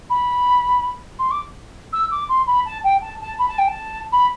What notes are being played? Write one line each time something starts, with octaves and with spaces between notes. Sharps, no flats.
B5
C6
D6
E6
D6
C6
B5
A5
G5
A5
A5
B5
A5
G5
A5
B5